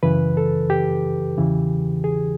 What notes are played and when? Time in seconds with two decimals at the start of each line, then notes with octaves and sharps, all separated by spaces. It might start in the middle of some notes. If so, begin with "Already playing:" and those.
0.03 F#2 C#3 E3 B4
0.37 A4
0.70 G4
1.38 E2 C#3 E3
2.04 G#4